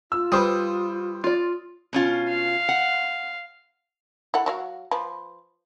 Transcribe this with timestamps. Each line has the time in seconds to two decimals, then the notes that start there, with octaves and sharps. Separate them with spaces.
0.12 F4 E6
0.32 G3 B4 C5 D#6
1.24 F4 D5
1.93 B2 C#4 F4
2.29 F5
2.69 F#5
4.34 E4 A4 F#5
4.46 F#3 F#4 F5
4.91 F3 B4